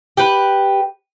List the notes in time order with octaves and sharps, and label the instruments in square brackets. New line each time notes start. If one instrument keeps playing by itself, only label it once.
[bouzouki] G4 B4